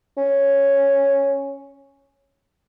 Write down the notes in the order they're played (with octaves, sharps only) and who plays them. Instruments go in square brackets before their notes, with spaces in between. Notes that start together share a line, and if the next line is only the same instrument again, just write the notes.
[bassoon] C#4